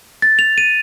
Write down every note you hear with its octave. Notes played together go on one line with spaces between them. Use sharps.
A6
F7
D#7